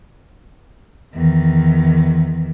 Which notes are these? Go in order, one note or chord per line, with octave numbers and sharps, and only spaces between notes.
E2 D#3